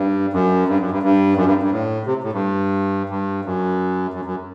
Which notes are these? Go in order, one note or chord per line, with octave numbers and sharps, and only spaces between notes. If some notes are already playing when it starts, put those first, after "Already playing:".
Already playing: G2
F#2
G2
F#2
G2
G2
F#2
G2
G2
A2
C3
A2
G2
G2
F#2
F#2
F#2